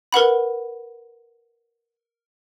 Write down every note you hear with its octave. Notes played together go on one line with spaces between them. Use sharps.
A#4 B4 F#5 B5